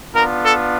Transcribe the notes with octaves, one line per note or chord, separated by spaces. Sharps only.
B3 D4 F4 A#4
A4